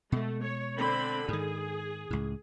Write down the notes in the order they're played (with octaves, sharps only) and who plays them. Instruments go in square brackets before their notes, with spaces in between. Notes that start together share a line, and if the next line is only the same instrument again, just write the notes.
[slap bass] B2 G#3 [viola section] A3
[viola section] C#5
D3 C4 B5
[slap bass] G#2 D#3 [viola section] G#4
[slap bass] C#2 A2